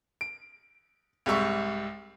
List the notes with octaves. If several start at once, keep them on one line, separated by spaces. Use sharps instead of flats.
D7
C2 G#2 G3 E5 C#6